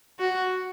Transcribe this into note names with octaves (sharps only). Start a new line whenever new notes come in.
F#4